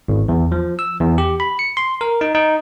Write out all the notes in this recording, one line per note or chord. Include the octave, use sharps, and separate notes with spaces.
G#1
E2
F3
E6
E2
G4
B5
C#7
C6
A#4
D#4
D#4